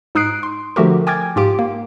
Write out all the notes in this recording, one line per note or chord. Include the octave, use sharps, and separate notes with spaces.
G#2 D#4 D#6 F#6 C7 D7
C6
D3 F3 A3 F#4 G4 A#4
G5 G#5 D6 F6 G#6 A6
G#2 F4 G4 D7
A#3